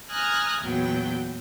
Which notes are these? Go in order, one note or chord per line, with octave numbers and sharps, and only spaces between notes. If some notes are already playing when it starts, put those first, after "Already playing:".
G#5 A#5 D#6 F6 F#6 G#6
E2 A#2 F#3 B3 G5